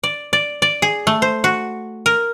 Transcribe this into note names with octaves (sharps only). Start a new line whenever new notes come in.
D5
D5
D5
G#4
A3
C5
F#4
A#4